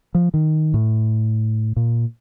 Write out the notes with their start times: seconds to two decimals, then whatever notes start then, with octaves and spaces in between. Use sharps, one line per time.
0.15 F3
0.34 D#3
0.74 A2
1.76 A#2